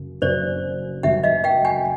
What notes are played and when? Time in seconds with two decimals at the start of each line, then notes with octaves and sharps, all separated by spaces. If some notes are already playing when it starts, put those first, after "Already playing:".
Already playing: F#1 F#2 C#3
0.22 F#1 F#2 C#3 F#3 C5 D5
1.03 F#1 F#2 C#3 F#3 E5 F#5
1.24 D#5 F5
1.44 F5 G5
1.65 F#5 G#5